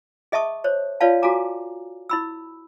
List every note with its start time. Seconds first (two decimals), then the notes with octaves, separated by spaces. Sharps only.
0.32 G#4 D#5 E5 A5 C#6 D#6
0.64 C5 C#5
1.00 F4 B4 C#5 D5 F5 A5
1.22 F#4 A4 F5 G#5 A#5 D6
2.09 E4 B5 E6